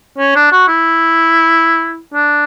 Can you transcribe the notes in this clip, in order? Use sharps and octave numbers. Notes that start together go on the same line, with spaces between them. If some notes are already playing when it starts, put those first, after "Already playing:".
C#4
D4
F#4
E4
D4